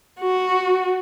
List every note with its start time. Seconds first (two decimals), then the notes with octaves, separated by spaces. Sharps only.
0.21 F#4